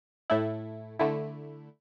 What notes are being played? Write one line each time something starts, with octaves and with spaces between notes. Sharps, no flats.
A2 A3 E4
D3 A3 E4